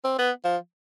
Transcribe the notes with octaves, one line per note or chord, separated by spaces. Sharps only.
C4
B3
F3